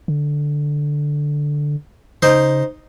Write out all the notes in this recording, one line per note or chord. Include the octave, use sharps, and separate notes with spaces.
D3
C#3 D#4 C5